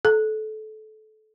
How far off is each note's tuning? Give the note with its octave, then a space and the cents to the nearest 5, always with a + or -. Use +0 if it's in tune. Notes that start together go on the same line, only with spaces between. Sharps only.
A4 -25